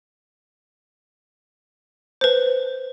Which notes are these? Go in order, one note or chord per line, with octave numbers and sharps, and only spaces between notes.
B4 C5